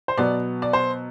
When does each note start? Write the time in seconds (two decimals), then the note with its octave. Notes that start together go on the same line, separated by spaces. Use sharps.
0.08 C5
0.18 B2 F#3 B3 D5
0.62 D5
0.73 C5